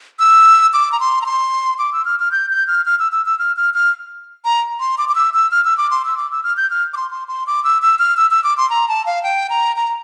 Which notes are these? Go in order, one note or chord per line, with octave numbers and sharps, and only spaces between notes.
E6
D6
A#5
C6
A#5
C6
D6
E6
F6
F6
G6
G6
F6
F6
E6
E6
E6
F6
F6
F6
A#5
C6
D6
D6
E6
E6
F6
E6
D6
C6
E6
D6
E6
F6
G6
F6
D6
C6
C6
C6
D6
E6
E6
F6
E6
E6
D6
C6
A#5
A5
F5
G5
A#5
A#5